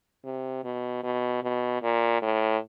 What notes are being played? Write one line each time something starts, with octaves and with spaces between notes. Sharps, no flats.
C3
B2
B2
B2
A#2
A2